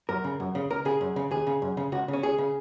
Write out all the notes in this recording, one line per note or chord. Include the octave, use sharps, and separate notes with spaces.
F#2 A#4
C#3
F#2
C#3
C#2 A#4
C#3 G#4
F#2
C#3
D#2 G#4
C#3
F#2
C#3
C#2 F#4
C#3
C#4
C#2 G#4
C#3